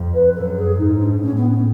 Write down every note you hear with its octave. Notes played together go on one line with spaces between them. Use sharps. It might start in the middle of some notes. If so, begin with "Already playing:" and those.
Already playing: F2
B4
F#2 A4
G#4
G#2 D#4
D4
A2 C#4
B3
C#4